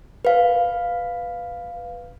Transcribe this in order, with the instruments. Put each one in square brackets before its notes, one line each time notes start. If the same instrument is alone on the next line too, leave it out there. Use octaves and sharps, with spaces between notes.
[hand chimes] B4 F5